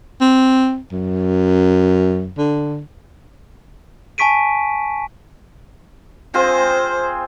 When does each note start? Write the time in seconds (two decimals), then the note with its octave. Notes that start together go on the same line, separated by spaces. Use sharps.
0.21 C4
0.92 F#2
2.38 D3
4.18 G#5 A5 C#6 B6 D7 D#7
6.34 C4 F4 G#4 C5